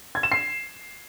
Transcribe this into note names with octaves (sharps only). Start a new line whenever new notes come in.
G#6
E7
C7